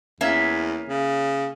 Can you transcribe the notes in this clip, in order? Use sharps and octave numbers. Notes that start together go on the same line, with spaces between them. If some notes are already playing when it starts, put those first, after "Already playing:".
E2 A#3 C#4 E5
C#3